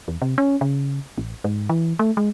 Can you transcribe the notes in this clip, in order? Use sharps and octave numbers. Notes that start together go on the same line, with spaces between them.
E2
C3
C#4
C#3
A1
G#2
E3
A3
G#3